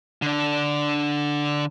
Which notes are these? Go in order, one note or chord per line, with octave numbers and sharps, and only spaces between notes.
D3 D4